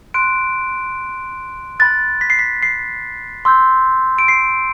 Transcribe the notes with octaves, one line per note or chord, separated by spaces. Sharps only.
C6 F#6 D7
B5 F#6 A6
B6
C7
B6
C7
C6 E6 G6
D7
C7